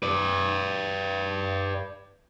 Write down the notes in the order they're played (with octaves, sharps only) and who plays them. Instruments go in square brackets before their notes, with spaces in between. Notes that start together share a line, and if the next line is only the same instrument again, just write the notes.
[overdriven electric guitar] B4 D5